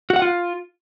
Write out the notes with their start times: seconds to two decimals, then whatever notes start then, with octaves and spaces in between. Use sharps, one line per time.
0.10 F#4
0.16 F#5
0.22 F4